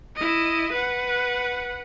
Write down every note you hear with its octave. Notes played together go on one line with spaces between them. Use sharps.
E4 D#5
B4 F#5